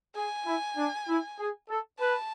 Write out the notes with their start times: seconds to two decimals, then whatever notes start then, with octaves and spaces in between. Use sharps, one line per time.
0.16 G#4 G#5
0.46 E4
0.77 D4
1.08 E4
1.39 G#4
1.69 A4
1.99 B4 A5